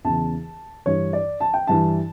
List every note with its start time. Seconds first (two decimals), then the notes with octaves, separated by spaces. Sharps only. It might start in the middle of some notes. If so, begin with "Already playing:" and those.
0.04 E2 C#3 E3 A5
0.86 G2 E3 C#5
1.13 D5
1.40 A5
1.54 G5
1.67 G2 E3 A5